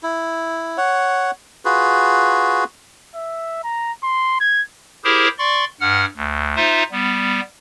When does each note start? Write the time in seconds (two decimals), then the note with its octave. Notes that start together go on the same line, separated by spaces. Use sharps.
0.03 E4
0.77 C#5 F#5
1.65 F4 F#4 G#4 B4
3.15 E5
3.64 A#5
4.03 C6
4.40 G#6
5.04 E4 G4 G#4 A#4 C5
5.38 D5 C6 C#6
5.81 G2 F#5 F6
6.17 D2
6.56 D#4 F4 C5 E5
6.92 G3 B3